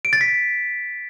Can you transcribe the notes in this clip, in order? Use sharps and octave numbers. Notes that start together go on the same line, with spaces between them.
D7
A6
B6